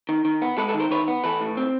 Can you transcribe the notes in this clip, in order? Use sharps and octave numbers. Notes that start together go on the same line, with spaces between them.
D#3
D#3
B3
G#3 A4 B4
A4 B4
D#3
A#4 C5
D#3 B4 C#5
B3
E3 A4 B4
A2
C4